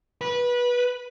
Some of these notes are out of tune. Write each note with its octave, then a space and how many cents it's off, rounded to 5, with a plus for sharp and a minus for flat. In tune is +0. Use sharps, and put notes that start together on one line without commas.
B4 -20